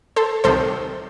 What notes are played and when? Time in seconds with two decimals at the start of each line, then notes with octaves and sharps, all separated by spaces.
0.16 A4 C5
0.44 C2 C3 D#3 A4 C5